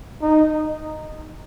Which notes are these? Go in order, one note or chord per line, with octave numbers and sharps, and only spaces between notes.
D#4